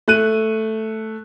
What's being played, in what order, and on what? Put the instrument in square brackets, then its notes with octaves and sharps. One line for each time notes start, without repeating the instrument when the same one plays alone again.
[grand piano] A3 F#6 D#7